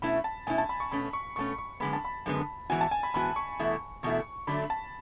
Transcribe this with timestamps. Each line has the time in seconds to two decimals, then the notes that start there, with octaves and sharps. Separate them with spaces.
0.02 B2 A3 C#4 E4 B5
0.24 A5
0.47 B2 A3 C#4 E4 G#5
0.58 A5
0.69 B5
0.80 C#6
0.92 B2 A3 C#4 B5
1.13 C#6
1.36 B2 A3 C#4 C#6
1.58 C#6
1.80 F#2 D3 G#3 B3 B5
1.93 A5
2.05 B5
2.26 F#2 D3 G#3 B3
2.70 G#2 E3 B3 F#4 G#5
2.81 A5
2.91 G#5
3.03 B5
3.14 G#2 E3 B3 F#4 B5
3.36 C#6
3.59 E2 B2 A3 E4
4.03 E2 B2 A3 E4 C#6
4.47 D3 F#3 A3 D4 B5
4.70 A5